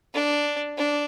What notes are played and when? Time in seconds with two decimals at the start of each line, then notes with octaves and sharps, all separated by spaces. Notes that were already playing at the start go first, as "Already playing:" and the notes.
0.14 D4
0.77 D4